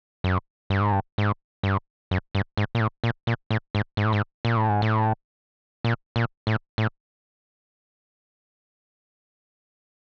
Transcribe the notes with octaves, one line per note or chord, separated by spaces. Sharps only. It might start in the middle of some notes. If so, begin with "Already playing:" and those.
F#2
G2
G#2
G2
G#2
G2
F#2
G2
G#2
A#2
A2
A#2
A#2
A2
G#2
G#2
A2
G#2
A#2
A2
G#2
A2
A#2
A#2
A2
A2